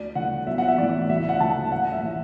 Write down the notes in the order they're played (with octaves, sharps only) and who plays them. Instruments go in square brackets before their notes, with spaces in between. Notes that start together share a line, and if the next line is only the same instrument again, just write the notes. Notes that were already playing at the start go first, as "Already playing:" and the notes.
Already playing: [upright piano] D2 D5
D3 F#5
B1 E5
F#5
E5
A2 E3 D5
D2 E5
F#5
D3 A5
A1 F#5
E5
A2 E3